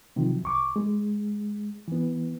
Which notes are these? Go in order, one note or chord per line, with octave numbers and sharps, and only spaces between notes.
C3 D#3 F3 F#3
C2 C#6 D6
G#3
E3 B3